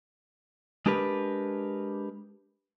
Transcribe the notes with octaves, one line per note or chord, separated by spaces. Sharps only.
G#3 D4 G4 A#4 B4